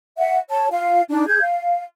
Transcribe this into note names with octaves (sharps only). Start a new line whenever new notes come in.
E5 F#5
C#5 A5
F4 F5
D4 D#4
G#4 G6 G#6
F5